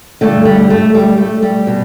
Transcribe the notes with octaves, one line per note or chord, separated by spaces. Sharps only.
G2 D3 A3
G3
A3
G3
A3
G3
B2